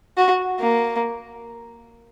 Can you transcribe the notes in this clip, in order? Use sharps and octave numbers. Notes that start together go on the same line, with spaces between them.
F#4
A#3